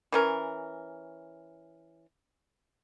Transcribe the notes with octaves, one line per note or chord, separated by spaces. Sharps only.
E3 C#4 A#4